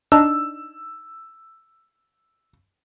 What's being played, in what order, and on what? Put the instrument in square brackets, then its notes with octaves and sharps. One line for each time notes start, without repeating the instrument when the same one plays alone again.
[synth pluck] D4 D#4 [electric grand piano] E6